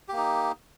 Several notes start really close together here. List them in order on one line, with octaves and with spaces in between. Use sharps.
G4 A#3 D#4